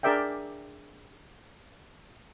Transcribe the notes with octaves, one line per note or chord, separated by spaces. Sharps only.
D4 G#4 A#4 D5 E5 G5